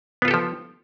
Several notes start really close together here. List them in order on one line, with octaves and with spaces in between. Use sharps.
B3 F4 A4 G4 F3